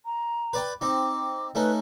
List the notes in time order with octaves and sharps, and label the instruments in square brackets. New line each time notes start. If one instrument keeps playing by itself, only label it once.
[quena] A#5
[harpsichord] B4 D5 G5
[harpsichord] C4 D#4 [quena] D6
[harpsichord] A3 C#4 D#4 [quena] B4